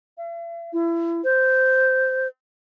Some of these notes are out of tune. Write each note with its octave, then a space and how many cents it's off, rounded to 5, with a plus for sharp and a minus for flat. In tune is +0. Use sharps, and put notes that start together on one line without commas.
E5 +45
E4 +30
C5 -10